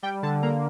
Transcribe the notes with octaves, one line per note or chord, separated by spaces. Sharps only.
G3 G5
D3 A5
A#3 A#5